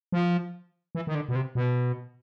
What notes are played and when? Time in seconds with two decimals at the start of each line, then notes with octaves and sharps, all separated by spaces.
0.12 F3
0.95 E3
1.07 D#3
1.15 D3
1.29 B2
1.35 C3
1.55 B2